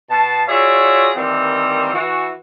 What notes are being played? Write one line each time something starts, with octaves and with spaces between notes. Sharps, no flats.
B2 A5
F4 F#4 G#4 C#5 D5 E5
D#3 E3 G3 A#3 C4
E3 F#4